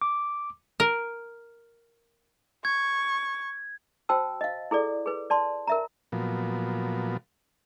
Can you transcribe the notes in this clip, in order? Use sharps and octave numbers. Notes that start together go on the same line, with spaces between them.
D6
A#4
C#6 G#6
F#4 C5 G5 A5 E6
D#5 F5
E4 G#4 A4 D5
G#4 B4
D5 A5 C6
A#4 E5 A#5
A#2 F3 F#3 B3